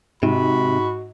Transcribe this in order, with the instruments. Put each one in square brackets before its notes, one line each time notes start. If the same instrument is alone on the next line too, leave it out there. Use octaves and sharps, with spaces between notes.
[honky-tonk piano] G#2 [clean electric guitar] C3 [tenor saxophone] F#4 [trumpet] B5